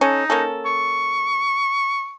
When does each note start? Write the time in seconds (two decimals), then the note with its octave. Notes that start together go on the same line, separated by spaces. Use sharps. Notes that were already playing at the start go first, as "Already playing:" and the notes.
0.01 C#4 D#4 A4
0.30 A#3 C#4 A4
0.65 C#6